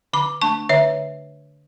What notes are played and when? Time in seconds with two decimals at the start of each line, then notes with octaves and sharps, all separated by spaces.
0.13 D3 B5 D6
0.41 A3 D4 A5 C#6
0.69 D3 C#5 E5